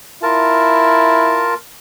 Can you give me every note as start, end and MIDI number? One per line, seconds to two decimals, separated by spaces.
0.23 1.49 64
0.23 1.54 65
0.23 1.54 70
0.23 1.54 81